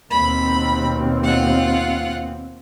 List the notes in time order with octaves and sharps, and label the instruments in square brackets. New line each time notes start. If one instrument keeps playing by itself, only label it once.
[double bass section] D#2 B2 C4 [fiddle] B5
[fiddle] F4 F#5